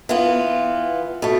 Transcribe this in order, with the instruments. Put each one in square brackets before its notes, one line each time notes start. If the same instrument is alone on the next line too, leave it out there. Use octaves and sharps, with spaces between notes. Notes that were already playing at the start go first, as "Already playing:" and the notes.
[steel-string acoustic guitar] E3 B3 F4
B2 A3